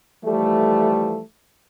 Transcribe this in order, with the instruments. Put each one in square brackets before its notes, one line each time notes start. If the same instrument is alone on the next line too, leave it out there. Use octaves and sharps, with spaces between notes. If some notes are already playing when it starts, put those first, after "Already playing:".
[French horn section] E3 F3 G3 A3